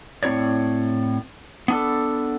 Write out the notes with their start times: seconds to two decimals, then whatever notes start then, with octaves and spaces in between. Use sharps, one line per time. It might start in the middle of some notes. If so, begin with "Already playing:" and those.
0.23 A2 C4 E4 C#5 D5
1.68 B3 D4 A4